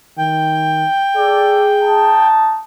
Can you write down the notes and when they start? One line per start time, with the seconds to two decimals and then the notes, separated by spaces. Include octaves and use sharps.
0.18 D#3 G5
1.16 G#4 A4 D5
1.83 D#4 A5